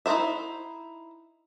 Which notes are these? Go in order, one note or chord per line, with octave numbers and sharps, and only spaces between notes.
D#4 E4 B4 C5 E5